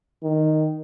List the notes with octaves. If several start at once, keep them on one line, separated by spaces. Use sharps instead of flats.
D#3